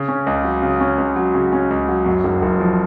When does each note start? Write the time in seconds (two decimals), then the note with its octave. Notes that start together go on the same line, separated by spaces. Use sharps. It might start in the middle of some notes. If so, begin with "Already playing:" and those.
Already playing: C#3
0.08 C#4
0.26 C#2
0.44 F#3
0.63 C#3
0.81 C#4
0.98 C#2
1.16 F#3
1.34 C#3
1.52 C#4
1.70 C#2
1.88 F#3
2.06 F#2
2.24 F#1
2.42 F#1
2.60 F3